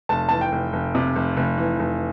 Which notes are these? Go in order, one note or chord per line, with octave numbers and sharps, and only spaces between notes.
F1 A5
E3 A5
G5
F1
F1
C3
F1
F1
E3
F1